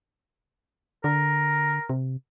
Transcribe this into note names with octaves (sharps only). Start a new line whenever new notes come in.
D3 A#4
C3